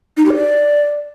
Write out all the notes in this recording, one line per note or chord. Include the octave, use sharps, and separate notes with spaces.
D#4
G4
D5